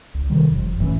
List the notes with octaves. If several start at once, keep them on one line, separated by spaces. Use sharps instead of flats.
C#2
C3 D#3 G3
F#1 F2
F#1 A2 E3 C#4